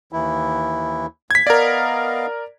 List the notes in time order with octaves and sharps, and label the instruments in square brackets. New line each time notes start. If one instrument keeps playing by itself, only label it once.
[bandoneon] D#2 E3 E4
[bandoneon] D2 [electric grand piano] G#6 B6
[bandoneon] B3 D#5 F5 [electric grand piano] A#4 D5